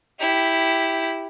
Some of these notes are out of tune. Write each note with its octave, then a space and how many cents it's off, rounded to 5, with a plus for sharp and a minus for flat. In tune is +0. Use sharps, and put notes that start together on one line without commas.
E4 +0 G4 +0